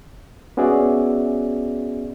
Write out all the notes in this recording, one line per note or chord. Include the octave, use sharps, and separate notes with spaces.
B3 C#4 F#4 G#4 D5 E5